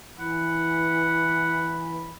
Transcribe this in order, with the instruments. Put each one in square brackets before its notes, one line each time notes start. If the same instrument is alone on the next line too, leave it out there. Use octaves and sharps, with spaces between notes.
[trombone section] E3 [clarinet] F#5 [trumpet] B5